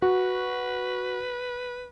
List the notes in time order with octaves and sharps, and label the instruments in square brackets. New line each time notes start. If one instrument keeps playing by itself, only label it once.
[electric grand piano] F#4 [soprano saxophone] B4